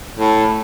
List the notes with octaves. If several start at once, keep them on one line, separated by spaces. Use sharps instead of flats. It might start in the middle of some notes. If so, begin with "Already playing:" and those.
A2